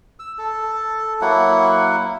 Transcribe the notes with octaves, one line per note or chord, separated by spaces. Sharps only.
E6
A4
F#3 A#3 E4 F#5